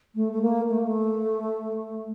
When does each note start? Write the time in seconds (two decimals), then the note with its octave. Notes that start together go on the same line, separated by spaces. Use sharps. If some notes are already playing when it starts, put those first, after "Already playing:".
0.15 A3
0.32 A3
0.42 A#3
0.69 A3
0.78 A#3
0.87 A3